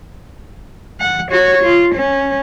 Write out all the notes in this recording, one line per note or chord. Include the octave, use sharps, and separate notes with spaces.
F#5
F#4 C#5
F4
C#4